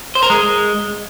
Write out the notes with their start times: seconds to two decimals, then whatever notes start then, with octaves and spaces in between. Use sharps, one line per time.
0.15 C5
0.23 A#4
0.30 G#3